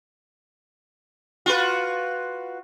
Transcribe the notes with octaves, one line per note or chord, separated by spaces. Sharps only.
F4 F#4 B4